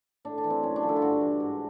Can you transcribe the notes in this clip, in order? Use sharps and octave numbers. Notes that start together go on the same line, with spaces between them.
A2 D4
D4
E3
C4
F#2 C#4
D4
D3 F3
E4
F4
G2 F#4
E3
G#2